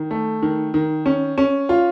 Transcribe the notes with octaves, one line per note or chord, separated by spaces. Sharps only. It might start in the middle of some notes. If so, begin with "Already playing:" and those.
Already playing: D#3
A3
D#3
D#3
C#4
C#4
F4